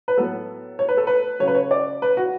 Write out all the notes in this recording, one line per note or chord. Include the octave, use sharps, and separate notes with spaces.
B4
A2 F#3 B3 A4
C#5
B4
A4
B4
C#3 F#3 A3 C#5
B4
C#5
D5
B4
F#4